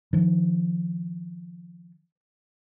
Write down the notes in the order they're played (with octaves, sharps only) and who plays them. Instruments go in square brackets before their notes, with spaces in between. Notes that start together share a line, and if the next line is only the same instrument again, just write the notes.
[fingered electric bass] D#3 F3